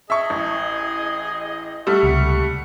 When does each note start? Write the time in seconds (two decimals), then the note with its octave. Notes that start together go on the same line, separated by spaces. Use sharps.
0.10 G#4 D#5 E5 C#6
0.30 A1
1.87 G3 A3 F#5 C#6 E6
2.03 C#2 C3